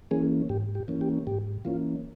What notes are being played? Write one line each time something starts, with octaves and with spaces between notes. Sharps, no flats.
E3 A#3 C#4 G#4
G#2 G4
G4
E3 A#3 C#4
G4
G#2 G4
E3 A#3 C#4 F4